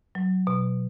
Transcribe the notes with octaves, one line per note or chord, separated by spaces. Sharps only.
F#3
B2